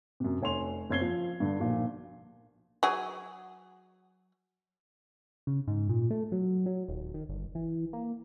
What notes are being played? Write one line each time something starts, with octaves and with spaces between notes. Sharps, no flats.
F#2 C3
F1 C#5 G#5 C6 F7
F#1 C4 C#5 G#6 C7 G7
F3
G2 D3
B1 A#2 F3
F#3 G#4
C#3
G#2
A#2
A3
F#3
F#3
D#1
D#3
G1
E3
A#3